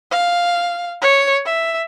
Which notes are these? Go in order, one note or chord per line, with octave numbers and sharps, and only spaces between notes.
F5
C#5
E5